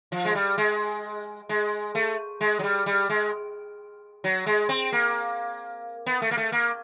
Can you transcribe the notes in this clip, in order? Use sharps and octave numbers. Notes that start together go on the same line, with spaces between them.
F3
G#3
G3
G#3
G#3
A3
G#3
F#3
G3
G3
G#3
F#3
G#3
C4
A#3
B3
A3
A#3
A3
A#3